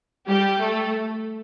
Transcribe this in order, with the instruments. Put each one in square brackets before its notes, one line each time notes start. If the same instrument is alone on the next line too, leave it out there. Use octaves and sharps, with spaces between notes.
[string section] G3 G4
A3 A4